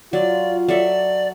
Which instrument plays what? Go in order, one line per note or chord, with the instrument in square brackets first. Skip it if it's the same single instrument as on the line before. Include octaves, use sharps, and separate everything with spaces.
[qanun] F#3 [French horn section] F4 [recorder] D5
[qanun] F#3 A4 E5 [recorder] D5